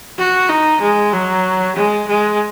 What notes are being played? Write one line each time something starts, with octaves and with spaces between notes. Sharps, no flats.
F#4
D#4
G#3
F#3
G#3
G#3